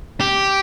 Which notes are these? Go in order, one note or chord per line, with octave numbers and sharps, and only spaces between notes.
G4